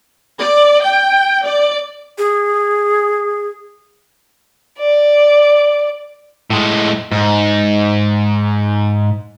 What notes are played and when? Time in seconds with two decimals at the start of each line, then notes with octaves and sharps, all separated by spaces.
0.40 D5
0.83 G5
1.46 D5
2.18 G#4
4.79 D5
6.50 A2 G#3
7.12 G#2